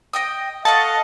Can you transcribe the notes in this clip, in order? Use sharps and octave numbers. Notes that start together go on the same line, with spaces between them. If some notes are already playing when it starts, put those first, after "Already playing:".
D#5 G5 D#6
A4 D#5 F5 F#5 A5 C#6